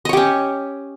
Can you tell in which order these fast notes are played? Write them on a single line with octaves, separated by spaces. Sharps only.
D#5 C#5 G4 C#4